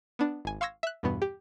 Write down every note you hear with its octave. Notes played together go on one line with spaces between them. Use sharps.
B3 D4
G#1 G#5
F5 C6 C#6 E6 G#6 A#6
E5 F#6
E2 G2 B2 B3
G4